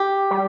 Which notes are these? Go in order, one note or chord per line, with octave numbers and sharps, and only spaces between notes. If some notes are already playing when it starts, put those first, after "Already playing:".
Already playing: G4
G3